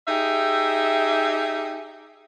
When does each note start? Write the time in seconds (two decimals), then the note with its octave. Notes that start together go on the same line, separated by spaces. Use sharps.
0.07 D#4 G4 G#4 E5